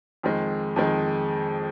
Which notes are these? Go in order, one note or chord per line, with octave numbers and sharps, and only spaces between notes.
F2 D#3 G#3
F2 D#3 G#3